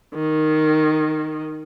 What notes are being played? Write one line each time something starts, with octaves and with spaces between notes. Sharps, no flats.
D#3